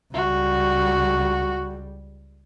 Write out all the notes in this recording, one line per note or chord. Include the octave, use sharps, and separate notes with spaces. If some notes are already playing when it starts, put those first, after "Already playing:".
C#2 G3 F#4